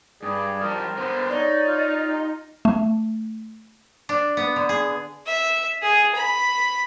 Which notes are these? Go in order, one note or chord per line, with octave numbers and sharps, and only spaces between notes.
G2 G#4 D5
F3 G3 A#4
D3 B3 C5
D#4 C#5 D5
F4
G4
A3
D4
B3
D3
G#4
E5
G#4
B5